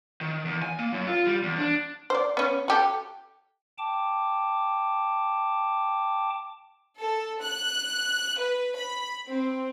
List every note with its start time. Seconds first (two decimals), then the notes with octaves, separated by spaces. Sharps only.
0.21 D#3
0.45 E2
0.62 G#5
0.79 A#3
0.93 F#2
1.07 F4
1.27 G3
1.43 E2
1.57 D4
2.10 C5 D5
2.37 B3 C#4
2.68 F#4 G4 A4
3.78 G5 A5 D6
7.01 A4
7.42 F#6
8.39 B4
8.78 B5
9.28 C4